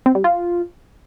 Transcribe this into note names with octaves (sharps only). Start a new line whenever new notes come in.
C4
G3
F4